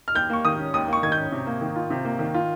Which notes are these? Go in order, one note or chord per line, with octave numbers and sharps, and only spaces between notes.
F6
D#2 G6
A#3 C#6
D#3 D#6
C#4
D#2 D#6
A#3 C#6
D#3 G#6
G6
C#4
C3
A#3
D#3
F4
C3
A#3
D#3
F4